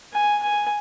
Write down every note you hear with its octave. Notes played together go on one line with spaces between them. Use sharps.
G#5
G#5